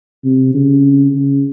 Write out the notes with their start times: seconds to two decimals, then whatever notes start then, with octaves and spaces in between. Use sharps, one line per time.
0.24 C3
0.54 C#3
1.15 C#3